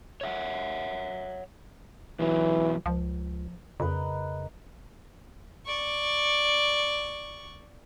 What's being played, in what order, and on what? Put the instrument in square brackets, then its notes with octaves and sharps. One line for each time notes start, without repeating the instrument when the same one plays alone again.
[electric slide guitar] C#5 E5 F#5
[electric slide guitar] E2 B2 F#3 [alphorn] E3
[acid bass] C#2 [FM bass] F3
[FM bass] F2 [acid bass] C#3 [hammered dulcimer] A#4 B4 D#5
[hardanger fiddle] D5 C#6